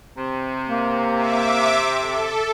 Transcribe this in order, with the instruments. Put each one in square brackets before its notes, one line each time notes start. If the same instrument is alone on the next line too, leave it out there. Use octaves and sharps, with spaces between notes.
[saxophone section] C3
[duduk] A#3
[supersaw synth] E5 D6
A4